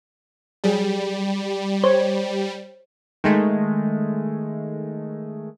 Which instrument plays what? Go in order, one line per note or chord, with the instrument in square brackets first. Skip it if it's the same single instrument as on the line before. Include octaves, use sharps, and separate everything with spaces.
[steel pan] F#3 G#4 [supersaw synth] G3
[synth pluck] C5 [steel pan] C#5
[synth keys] D#3 G#3 A3